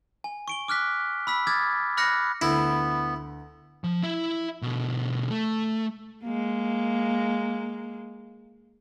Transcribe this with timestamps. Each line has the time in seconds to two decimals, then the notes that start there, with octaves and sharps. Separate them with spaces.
0.24 G#5
0.48 C#6 D7 G7
0.68 D6 F6 F#6 B6
1.27 B5 E6 B6
1.47 D6 D#6 F6 G#6 A6
1.97 B5 D6 F6 F#6 A#6 C#7
2.42 D2 B3 E4
3.84 F3
4.03 E4 E5
4.62 B2 D3
5.31 A3
6.24 G#3 A#3